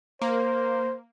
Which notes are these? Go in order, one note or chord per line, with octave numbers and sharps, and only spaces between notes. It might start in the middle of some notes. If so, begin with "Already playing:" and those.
A#3 C5